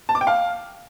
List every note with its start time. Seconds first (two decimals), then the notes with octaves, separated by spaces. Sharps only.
0.09 A5
0.15 D6
0.21 G5
0.27 F5